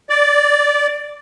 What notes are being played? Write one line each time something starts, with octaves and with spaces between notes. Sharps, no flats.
D5